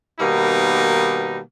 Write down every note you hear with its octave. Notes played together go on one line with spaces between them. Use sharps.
B2 D#3 G3 A#3 B3 D#4